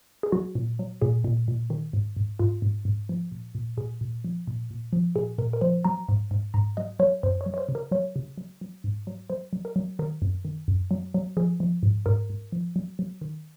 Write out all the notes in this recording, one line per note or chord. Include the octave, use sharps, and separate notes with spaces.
G#4
F#3 F#4
A#2
F#3
A#2 G#4
A#2
A#2
D#3
G#2
G#2
G#2 F4
G#2
G#2
F3
A#2
A#2
A#2 G#4
A#2
F3
A#2
A#2
F3
A#2 G#4
A#2 A#4
A#4
F3 C5
F#3 A#5
G#2
G#2
G#2 A#5
F#3 D#5
F#3 C#5
F#2 C5
C#5
F#3
C#5
C5
C#3
A#4
F#3 C#5
C#3
F#3
F#3
G#2
F#3
F#3 C5
F#3
A#4
F#3
D#3 A#4
F#2
D#3
F#2
F#3
F#3
F3 G#4
F3
G#2
G#2 A#4
G#2
F3
F#3
F#3
D#3